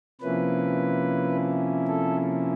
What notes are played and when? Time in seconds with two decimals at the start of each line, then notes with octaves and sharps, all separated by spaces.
0.21 C3 F3 A#3 C#4 E4 B4
1.87 A4